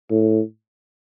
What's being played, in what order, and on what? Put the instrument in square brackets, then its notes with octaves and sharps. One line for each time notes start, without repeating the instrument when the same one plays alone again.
[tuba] A2